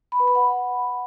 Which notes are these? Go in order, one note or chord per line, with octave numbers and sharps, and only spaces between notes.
B5
B4
B5
F#5